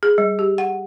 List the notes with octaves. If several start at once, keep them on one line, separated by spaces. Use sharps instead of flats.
G#4
G3
G4
F#5